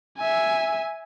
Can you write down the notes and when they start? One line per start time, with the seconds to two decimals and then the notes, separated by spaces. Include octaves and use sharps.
0.18 E5 G#5